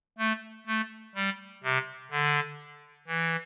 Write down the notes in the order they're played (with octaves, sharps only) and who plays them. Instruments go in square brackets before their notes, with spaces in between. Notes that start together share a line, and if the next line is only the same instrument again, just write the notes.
[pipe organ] A3
A3
G3
C3
D3
E3